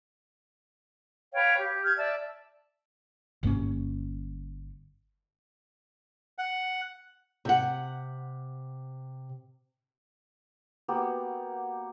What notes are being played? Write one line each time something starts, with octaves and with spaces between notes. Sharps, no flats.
B4 C#5 F5 G5
G4
F6 G6 G#6
D5 E5 A5
G1 G2 A#3 C#4
F#5
C3 F#5
A#3 B3 F#4 G4